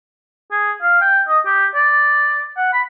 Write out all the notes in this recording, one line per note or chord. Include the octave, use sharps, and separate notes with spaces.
G#4
F5
G5
D#5
G4
D5
F#5
B5